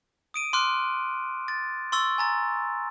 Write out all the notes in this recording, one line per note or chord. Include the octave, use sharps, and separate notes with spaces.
D#6 D7 D#7
C6 D6 F6 F#6
A6
C6 C#6 E6 A6
G#5 A#5 A6